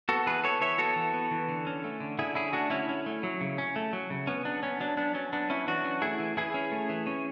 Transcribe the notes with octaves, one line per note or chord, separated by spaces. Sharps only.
B3 F#4 A4
E3 G#4 B4
B3 A4 C#5
E3 C#5 E5
B3 F#4 A4
E3
B3
E3
D3
C#4
A3
D3
D3 E4 G#4
C#4 E4 G#4
A3 D4 F#4
D3 C#4 E4
C#4
A3
F#3
C#3
C#4
A3
F#3
C#3
B3 C#4
F#3 D4
B3 C#4
F#3 D4
B3 D4
F#3 C#4
B3 D4
F#3 C#4 E4
E3 D4 F#4
C#4
A3 E4 G#4
E3
E3 E4 G#4
C#4
A3
E3
C#4